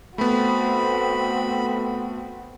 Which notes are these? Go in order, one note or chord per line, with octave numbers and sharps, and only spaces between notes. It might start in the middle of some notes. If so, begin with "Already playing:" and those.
A3 B3 C4 F#4 B5